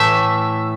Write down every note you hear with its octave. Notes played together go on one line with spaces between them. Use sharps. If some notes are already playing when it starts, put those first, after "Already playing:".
Already playing: A2 E3 A3 E5